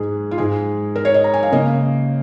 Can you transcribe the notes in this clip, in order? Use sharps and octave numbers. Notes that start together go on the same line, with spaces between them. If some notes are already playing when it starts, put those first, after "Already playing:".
Already playing: G#2 G#3 G#4
F4
G#2 G#3 G#4
A#4
C#5
D#5
A#5
G#5
F5
C#3 A#3 D#5